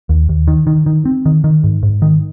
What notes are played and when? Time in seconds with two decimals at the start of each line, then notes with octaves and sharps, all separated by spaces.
0.09 D#2
0.29 D#2
0.48 D#3
0.67 D#3
0.86 D#3
1.06 C4
1.26 D#3
1.44 D#3
1.64 G#2
1.83 G#2
2.02 D#3